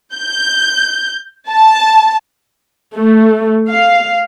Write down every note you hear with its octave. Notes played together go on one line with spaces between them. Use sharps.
G6
A5
A3
F5